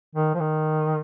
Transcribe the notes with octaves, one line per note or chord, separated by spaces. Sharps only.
D#3
F3
D#3